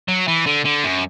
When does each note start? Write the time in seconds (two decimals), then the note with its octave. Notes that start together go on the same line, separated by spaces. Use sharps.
0.08 F#3
0.28 E3
0.46 D3
0.65 D3
0.84 F#2